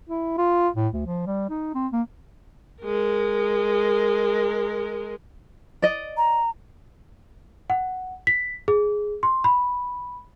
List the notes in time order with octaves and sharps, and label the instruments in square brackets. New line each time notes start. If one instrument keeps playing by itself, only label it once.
[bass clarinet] E4
F4
A2
D2
F3
G3
D#4
C4
A#3
[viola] G#3 A#4
[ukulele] D5 D#5
[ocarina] A#5
[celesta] F#5
B6
G#4
C6
B5